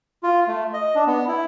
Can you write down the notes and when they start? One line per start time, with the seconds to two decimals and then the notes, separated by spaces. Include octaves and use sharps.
0.23 F4
0.48 A3
0.73 D#5
0.95 D4
1.07 B3
1.28 E4